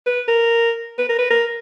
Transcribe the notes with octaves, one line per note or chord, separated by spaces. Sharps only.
B4
A#4
B4
A#4
B4
A#4